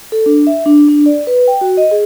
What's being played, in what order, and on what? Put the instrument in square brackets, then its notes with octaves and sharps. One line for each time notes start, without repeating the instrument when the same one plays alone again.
[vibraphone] A4
D4
E5
D4
D4
D5
B4
G5
F#4
D#5
G#4